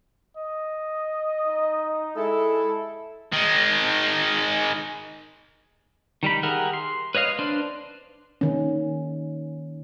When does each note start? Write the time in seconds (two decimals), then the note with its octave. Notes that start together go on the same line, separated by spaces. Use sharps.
0.37 D#5
1.47 D#4
2.17 G#3 E4 A4
3.32 D#3 G#3
6.23 D#3 G3 D#4 B5
6.43 G4 G#4 A#4 E5 F#5
6.73 C6
7.15 B4 C#5 D#5 F5
7.39 D4 B4 C5 D5
8.41 D#3 C#4